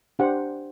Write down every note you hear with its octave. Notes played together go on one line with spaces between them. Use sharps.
D4 G4 C5 F#5